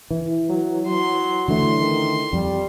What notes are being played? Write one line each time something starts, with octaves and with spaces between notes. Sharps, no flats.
E3
F#3
F#3 C6
D3 E3 A3 C6
D#3
F2 G3